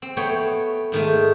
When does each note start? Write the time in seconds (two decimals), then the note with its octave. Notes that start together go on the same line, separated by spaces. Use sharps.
0.02 C4
0.17 A3 B3 C#5 G5
0.92 G#2 D#3 A3